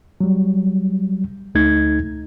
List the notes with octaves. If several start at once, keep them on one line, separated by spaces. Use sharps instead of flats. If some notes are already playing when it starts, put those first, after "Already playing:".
F#3 G3
D2 A3 D#4 G#6